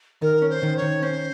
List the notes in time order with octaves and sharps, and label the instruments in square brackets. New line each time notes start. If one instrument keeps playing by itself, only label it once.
[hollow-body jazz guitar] D#3 [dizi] A#4
[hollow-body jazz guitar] C#4
[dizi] C5
[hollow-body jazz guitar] D#3
[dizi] C#5
[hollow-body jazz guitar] D#3
[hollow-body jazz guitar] C#4 [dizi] C5